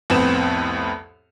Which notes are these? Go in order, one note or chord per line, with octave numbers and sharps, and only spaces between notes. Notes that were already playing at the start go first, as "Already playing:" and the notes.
C2 F2 A2 B3 C4 E7